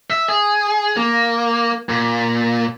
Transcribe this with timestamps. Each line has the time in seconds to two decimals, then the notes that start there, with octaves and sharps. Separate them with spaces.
0.10 E5
0.28 G#4
0.97 A#3
1.89 A#2